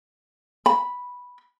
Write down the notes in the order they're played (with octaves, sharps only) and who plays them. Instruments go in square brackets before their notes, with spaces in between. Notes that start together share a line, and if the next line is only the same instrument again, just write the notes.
[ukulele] B5